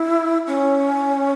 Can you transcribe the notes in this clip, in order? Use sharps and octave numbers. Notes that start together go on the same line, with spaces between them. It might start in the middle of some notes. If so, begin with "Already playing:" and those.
Already playing: E4
C#4